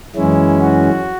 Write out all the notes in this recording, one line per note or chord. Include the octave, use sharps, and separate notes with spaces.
F#2 E3 G#3 C#4 E4
F#4